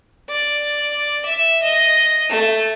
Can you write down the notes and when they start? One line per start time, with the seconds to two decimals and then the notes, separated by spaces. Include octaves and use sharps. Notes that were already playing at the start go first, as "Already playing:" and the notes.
0.29 D5
1.26 E5
1.63 D#5
2.29 A3